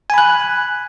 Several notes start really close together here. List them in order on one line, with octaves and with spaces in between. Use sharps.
G#5 B5 F#6